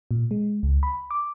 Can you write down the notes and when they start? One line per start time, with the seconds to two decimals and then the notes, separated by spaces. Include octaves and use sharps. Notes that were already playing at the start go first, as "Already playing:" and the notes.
0.11 A#2
0.31 G#3
0.63 C#2
0.83 B5
1.11 D6